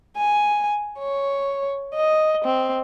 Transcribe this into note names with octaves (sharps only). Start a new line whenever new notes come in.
G#5
C#5
D#5
C4